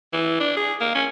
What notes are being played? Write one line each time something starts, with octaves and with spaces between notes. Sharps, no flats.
E3
D4
G#4
A#3
C#4